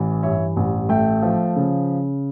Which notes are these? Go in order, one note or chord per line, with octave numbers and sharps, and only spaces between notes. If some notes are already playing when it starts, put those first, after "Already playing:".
Already playing: A1 E3
G2 C#5 E5
A1
A3 E5 G5
F3
C#3